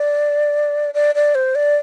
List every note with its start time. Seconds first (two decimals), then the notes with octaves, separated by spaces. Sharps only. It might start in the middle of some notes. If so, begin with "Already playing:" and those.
Already playing: D5
0.94 D5
1.15 D5
1.35 C5
1.55 D5